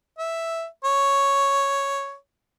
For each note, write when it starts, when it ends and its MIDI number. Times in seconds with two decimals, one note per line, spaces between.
0.18 0.65 76
0.84 2.14 73